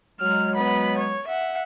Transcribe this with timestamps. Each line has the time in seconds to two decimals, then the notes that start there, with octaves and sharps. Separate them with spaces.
0.20 F#3 G#3 F6
0.55 B3 B5
0.98 C#5
1.27 E5 F#5